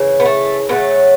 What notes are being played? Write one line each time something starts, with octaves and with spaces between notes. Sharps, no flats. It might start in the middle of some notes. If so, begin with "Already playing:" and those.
Already playing: C#3 E3
B3
A3
C#3 F#3 A3 B3